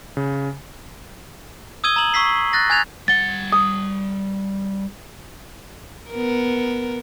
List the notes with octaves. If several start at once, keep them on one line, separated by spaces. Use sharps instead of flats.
C#3
D#6 E6 G#6 D#7 G7
A#5 F#7
C#6 E6 B6 C7
F#6 A6 A#6
G#5 F#6 G#6 A6 F7
G3 F#5 A6 G7
D#6
B3 A#4